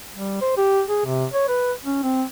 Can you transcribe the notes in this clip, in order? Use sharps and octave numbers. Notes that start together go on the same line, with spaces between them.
G3
C5
G4
G#4
C3
C#5
B4
C#4
C4